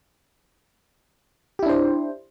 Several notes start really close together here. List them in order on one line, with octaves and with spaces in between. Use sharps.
G4 E4 D4 C5